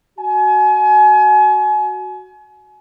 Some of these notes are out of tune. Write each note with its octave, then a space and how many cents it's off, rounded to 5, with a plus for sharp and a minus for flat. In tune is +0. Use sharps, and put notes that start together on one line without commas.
F#4 +10 G#5 +35